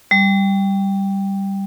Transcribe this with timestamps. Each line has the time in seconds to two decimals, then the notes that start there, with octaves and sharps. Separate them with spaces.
0.11 G3